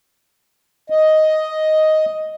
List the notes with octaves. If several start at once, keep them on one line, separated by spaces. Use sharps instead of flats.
D#5